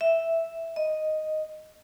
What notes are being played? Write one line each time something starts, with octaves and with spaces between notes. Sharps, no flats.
E5
D#5